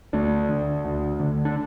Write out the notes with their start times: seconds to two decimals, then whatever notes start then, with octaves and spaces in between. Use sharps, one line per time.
0.13 D2 A3 D4
0.49 D3
0.85 D2
1.20 D3
1.45 D4